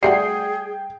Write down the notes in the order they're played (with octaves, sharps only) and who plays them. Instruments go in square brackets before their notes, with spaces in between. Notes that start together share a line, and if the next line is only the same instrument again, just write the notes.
[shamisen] G3 A3 F#4 [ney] G#4 [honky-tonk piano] G5 C7